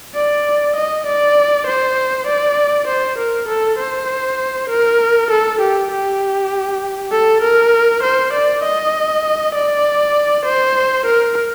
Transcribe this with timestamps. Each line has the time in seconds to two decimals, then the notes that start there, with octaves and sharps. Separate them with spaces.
0.15 D5
0.76 D#5
1.06 D5
1.67 C5
2.27 D5
2.87 C5
3.18 A#4
3.48 A4
3.79 C5
4.70 A#4
5.30 A4
5.61 G4
5.91 G4
7.12 A4
7.42 A#4
8.03 C5
8.33 D5
8.63 D#5
9.54 D5
10.45 C5
11.06 A#4